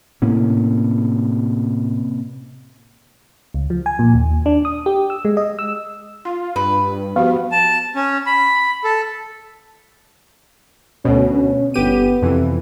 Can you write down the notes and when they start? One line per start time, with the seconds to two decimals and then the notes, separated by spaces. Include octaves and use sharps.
0.22 A2 C3 A#3 C#4
3.54 C#2
3.70 F3
3.86 G#5
3.99 A#2
4.14 D#2
4.46 D4
4.65 D#6
4.86 G4
5.10 E6
5.25 G#3
5.37 D#5
5.59 E6
6.25 F4 C6
6.56 G2 B4
7.16 F3 B3 F#4 G4 F5
7.52 A5
7.96 C#4
8.26 B5
8.84 A4
11.05 D2 B2 C#4
11.35 C#4
11.74 G1 B3 G4 D#7
12.22 F2 C3 E3